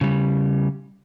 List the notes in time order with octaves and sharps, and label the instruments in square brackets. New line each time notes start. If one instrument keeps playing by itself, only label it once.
[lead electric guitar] C#3 G3